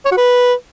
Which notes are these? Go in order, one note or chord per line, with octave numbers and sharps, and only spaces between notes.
C#5
F#4
B4